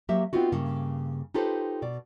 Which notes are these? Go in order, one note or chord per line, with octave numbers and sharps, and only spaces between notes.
F#3 A#3 G4 C5 E5
B3 C4 D#4 F4 F#4
G2 C#3 A#3
D#4 F4 G4 A4 B4 C5
B2 D5